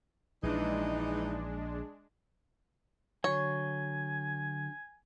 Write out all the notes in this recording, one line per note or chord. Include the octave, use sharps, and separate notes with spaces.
A#1 E3 G#3 D4 D#4
D3 F#3 C#5 G#5